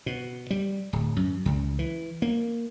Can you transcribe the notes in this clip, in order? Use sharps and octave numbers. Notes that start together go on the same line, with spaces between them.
B2
G3
D1
F#2
C#2
E3
A#3